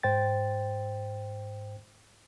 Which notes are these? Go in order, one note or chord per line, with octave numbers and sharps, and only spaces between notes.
G#2 C5 G5 A6